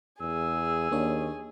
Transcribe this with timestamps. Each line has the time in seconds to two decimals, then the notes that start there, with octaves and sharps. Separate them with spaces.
0.20 E2 G#4 E6
0.92 D#2 A#3 D4 C#5